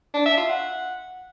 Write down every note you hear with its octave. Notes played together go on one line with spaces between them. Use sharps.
D4
E5
F4
F#5